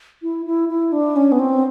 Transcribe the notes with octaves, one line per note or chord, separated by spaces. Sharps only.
E4
E4
E4
D4
C#4
B3
C4